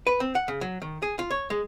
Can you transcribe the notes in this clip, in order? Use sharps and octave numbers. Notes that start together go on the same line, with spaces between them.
B4
C4
F#5
C#3
F#3
D#3
G#4
F4
C#5
G#3